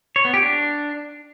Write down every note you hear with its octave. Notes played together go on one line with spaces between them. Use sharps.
C#5
B3
G4
D4